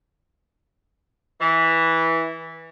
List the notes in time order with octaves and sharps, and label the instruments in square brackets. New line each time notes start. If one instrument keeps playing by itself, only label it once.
[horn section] E3